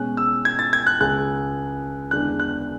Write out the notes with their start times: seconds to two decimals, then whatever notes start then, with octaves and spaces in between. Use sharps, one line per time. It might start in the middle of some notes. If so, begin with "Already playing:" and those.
Already playing: B2 G#3 C#4 F#6
0.17 E6
0.45 G#6
0.59 A6
0.73 G#6
0.87 F#6
1.00 C#2 C#3 G#3 F#6
2.11 E2 D3 G#3 D4 F#6
2.40 F#6